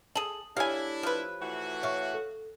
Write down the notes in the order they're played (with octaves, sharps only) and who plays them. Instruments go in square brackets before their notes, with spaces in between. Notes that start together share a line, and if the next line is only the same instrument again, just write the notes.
[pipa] G#4 A4 [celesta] F#7
[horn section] A3 D4 E4 [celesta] G4 C#5 [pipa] F5 G#5
[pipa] F3 B4
[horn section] E3 A3 F#4
[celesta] C#5 E5 C#6 [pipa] F5
[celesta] A4